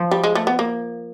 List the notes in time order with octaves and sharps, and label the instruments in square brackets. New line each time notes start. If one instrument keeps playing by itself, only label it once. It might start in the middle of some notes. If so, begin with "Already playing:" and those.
Already playing: [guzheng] F3
[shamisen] G3
G#3
A3
B3
A#3